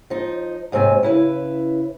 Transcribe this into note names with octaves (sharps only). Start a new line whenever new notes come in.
F3 D#4
D#2 G#2 C3 C4 G#5
C#3 E4 B4